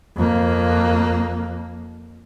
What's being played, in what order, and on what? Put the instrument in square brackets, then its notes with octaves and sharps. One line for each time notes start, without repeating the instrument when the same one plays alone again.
[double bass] F2 A#3